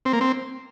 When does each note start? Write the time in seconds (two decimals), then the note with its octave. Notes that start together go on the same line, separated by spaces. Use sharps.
0.05 C4
0.13 A#3
0.21 C4